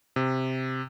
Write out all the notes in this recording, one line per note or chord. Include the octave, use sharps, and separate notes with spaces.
C3